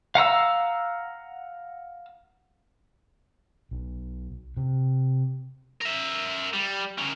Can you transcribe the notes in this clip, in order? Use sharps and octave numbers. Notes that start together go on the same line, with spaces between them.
F5 F#5 A#5 E6
B1
C3
A#4 E5
G3
A#3 C#4